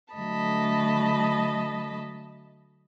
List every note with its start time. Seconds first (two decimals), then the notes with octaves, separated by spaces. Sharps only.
0.14 D3 F#3 A3 D#5 A5 B5